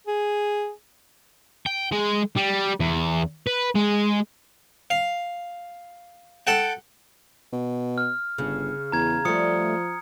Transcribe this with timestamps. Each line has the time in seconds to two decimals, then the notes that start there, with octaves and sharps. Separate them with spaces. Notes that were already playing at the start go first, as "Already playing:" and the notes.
0.07 G#4
1.66 G5
1.92 G#3
2.37 G3
2.80 E2
3.47 B4
3.75 G#3
4.90 F5
6.47 A4 F#5 G5
7.52 B2
7.98 F6
8.38 G1 C#3
8.92 E2 A#5 G#6
9.25 F3 G3 A3 D#6 C#7